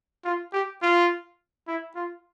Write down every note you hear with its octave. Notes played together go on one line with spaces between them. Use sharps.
F4
G4
F4
E4
F4